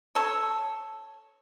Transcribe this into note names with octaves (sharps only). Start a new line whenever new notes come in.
A4 C#5